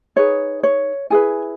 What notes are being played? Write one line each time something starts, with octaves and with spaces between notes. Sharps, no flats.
D#4 G#4 B4 C#5
C#5
E4 G#4 B4 G#5